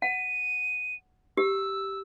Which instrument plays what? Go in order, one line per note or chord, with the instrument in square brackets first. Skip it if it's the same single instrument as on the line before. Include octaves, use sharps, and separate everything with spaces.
[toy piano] F#5 [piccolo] D#7
[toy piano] G4 [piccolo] E6